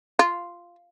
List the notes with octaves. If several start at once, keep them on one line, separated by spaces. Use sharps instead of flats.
F4